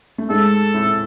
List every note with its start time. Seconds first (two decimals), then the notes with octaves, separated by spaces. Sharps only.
0.18 A3
0.30 G#2 G#3 A4
0.74 A2 A3